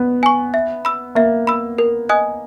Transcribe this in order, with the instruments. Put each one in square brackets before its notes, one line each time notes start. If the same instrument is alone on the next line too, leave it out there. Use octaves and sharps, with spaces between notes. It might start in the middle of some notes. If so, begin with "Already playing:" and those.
Already playing: [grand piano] B3
[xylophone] G#5 C#6
E5
B5 E6
[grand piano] A#3 [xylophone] E5
[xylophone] B5 E6
A#4
D#5 G#5 D#6 F#6